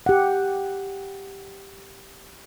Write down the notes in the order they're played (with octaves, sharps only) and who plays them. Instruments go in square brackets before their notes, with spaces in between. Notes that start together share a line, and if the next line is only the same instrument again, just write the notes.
[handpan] G4 F#5